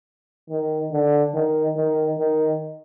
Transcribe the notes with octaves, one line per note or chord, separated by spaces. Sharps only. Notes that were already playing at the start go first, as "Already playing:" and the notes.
D#3
D3
D#3
D#3
D#3